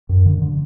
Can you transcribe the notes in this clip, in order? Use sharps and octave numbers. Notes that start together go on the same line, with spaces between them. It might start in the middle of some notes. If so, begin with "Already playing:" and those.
F#2
D3
D3